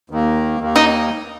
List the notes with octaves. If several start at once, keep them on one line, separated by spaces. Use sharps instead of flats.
D#2 D#3 A#3
D#2 D#3 A#3
D#4